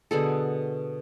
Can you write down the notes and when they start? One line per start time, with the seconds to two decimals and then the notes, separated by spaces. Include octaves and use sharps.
0.11 B2 D3 G#4 A4